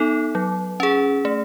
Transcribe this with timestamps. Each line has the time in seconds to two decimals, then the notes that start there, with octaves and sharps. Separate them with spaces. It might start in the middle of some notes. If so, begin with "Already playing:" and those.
Already playing: B3 D#4 A4
0.35 F#3
0.80 C#4 G#4
1.25 A3